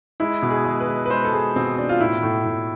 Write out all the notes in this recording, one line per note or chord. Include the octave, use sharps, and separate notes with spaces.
G#3 E4
B2
G#4
G#3
B4
G#3
B4
G#3 C5
A4
G#3 G#4
B2 C4
B2 D4
F4
A2 E4
A2
A2